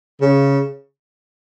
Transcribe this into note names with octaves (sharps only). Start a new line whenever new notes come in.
C#3